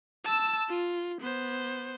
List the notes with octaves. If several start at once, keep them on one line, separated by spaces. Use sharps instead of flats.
A5 E6
F4
B3 C5